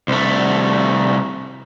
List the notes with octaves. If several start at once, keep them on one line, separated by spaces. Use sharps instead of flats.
C2 A3